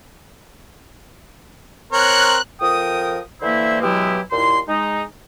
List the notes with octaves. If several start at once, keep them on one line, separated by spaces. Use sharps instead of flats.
C4 A#4 C#5 F#6
F2 F3 A#4 G5 D#6
D3 E3 A#3 E4 C5 E5
B2 E3 F#3 G#3 E4 G4
D#2 A#2 E4 C6
G#3 D#4